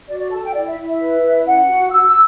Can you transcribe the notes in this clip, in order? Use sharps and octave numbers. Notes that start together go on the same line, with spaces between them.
F#4 D5
D5
A4 A5
G5
E4 D5
E5
E4
E5
B4
E4
C#4 F#5
F#4
F#4 E6
E6